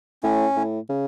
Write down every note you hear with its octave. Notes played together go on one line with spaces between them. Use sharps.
A2 C#4
A2
C#3